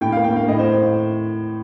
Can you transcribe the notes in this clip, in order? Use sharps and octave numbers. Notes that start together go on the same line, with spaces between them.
A2 G5
F5
A#3
G5
A#3 F5
A2 D#5
C5
A2